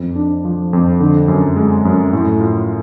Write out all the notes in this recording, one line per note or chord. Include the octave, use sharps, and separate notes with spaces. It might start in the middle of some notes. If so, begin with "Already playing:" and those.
Already playing: F2
D4
F3
F2
D3
F#2
G#3
F#2
A2
F4